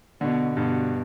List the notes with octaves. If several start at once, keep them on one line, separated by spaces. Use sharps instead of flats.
B2 D3
G2 B2